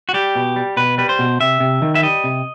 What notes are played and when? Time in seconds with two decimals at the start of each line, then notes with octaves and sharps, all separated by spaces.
0.09 F#4
0.14 G3 G4
0.36 B2
0.56 G3
0.77 B2 B4
0.98 G3 B4
1.09 C5
1.19 B2
1.40 C3 E5
1.60 C3
1.82 D#3
1.95 E5
2.03 G3 D#5
2.24 C3